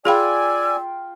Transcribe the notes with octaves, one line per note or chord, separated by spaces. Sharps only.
F4 G#4 D5 F5 G5 G#5 B5 E6